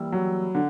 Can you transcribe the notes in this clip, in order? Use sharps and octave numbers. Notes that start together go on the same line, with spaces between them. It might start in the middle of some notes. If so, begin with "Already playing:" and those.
Already playing: E3 G3 A#3 E4
F#3
D3